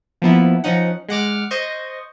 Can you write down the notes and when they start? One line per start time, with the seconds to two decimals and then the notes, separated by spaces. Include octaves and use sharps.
0.22 F3 A#3 B3 E4
0.64 F3 C#4 D#4 F#5
1.08 G#3 F#5 D6 F6
1.51 C5 D#5 C#6